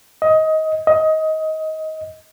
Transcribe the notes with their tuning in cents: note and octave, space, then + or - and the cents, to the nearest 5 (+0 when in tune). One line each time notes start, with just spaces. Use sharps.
D#5 +20
D#5 +20